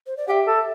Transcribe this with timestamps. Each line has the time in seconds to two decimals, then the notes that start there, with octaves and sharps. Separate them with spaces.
0.07 C5
0.17 D5
0.28 G4 E5 F#5
0.47 A4